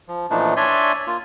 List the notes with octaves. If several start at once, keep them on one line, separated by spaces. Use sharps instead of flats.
F3
A#2 E3 F3 A3 D4 D#4
D4 C#5 D5 E5 G#5 C6
A#3 F4